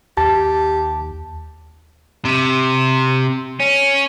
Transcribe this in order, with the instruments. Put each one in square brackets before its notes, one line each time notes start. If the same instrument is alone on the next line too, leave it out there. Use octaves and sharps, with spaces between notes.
[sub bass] D#2 [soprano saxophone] G4 [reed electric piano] A5
[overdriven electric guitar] C3
C#4